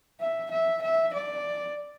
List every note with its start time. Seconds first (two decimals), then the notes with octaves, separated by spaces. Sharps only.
0.20 E5
0.51 E5
0.82 E5
1.14 D5